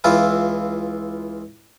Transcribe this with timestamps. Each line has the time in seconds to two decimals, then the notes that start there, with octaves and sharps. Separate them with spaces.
0.04 C#2 E3 E4 F4